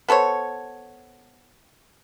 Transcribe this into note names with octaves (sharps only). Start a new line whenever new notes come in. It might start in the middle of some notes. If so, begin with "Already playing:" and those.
B3 A4 C5 C#5